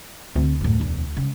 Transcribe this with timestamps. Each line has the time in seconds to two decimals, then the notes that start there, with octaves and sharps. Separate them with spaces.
0.36 D2 D3 C4
0.61 F#2 A2
0.80 E1 E2
1.17 C#3 G#3